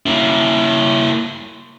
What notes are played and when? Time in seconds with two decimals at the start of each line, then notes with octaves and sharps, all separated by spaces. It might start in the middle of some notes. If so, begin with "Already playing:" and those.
0.06 A#3 E4